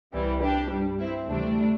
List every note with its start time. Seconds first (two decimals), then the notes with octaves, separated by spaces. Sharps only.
0.13 C2 C3 E3 G3
0.42 D4 G4
0.71 G2 G3
1.00 C4 E4
1.28 D2 C3 E3 G3 A3 D4